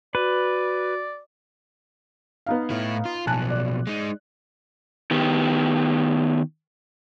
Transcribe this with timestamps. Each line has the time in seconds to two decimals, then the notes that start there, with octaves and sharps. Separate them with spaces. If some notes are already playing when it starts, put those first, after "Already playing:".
0.15 F#4 B4 D5
2.46 B3 D#4 F5
2.70 A2 E4
3.05 F4
3.27 B1 F3 G#5 A5 F#6
3.50 D5
3.87 G#3 D#4
5.11 D#3 B3 G4